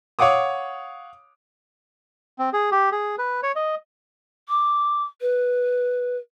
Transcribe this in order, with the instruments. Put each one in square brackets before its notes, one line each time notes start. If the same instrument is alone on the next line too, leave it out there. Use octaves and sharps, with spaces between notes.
[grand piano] C#5 F5 F#5 D6 D#6
[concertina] C4
G#4
G4
G#4
B4
C#5
D#5
[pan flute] D6
B4